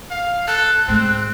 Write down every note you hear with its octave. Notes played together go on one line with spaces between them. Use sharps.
F5
A4 F#6
G#2 A3 C4